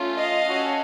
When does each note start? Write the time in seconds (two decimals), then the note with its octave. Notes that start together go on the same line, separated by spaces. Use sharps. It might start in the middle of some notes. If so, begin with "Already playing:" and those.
Already playing: A3 C#4 F4
0.17 D#5 F5
0.47 C#4 F#4 A4